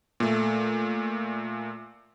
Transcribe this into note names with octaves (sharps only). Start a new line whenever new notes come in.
A#2 A3